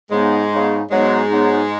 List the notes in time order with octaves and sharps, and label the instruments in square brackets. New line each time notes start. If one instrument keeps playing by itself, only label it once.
[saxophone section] G#2 G#3 [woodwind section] C#3 B3 D#4
[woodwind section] C#3 B3 D#4
[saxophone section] G#2 G#3 [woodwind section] F#3 B3 D#4
[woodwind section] F#3 B3 D#4